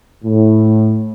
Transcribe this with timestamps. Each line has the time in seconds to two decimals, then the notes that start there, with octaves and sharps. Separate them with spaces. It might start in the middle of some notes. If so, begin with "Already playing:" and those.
0.23 A2